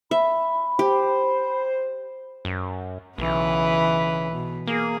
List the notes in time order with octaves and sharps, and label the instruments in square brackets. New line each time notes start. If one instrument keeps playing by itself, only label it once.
[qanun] E5 [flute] B5
[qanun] G4 [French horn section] C5
[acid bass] F#2
[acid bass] B1 [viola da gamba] C#3 E3 B4
[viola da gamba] B2
[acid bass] A#3 [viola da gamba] G#4